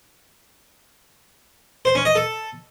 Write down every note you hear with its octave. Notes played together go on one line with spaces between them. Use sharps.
C5
C#4
D#5
A4